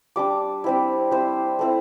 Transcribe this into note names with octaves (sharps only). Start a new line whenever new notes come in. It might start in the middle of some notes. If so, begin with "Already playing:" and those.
G3 D4 D6
G3 C4 E4
G3 C4 E4 C5
A3 C4 E4